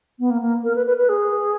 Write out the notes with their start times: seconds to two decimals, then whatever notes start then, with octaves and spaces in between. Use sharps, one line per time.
0.19 B3
0.30 A#3
0.42 A#3
0.64 A#4
0.75 B4
0.86 B4
0.97 B4
1.09 G#4